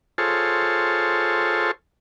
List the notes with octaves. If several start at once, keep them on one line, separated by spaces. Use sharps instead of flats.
F4 G#4 A4 C5 C#5